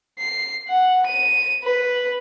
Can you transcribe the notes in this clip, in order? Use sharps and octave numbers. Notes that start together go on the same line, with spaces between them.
C7
F#5
D#7
B4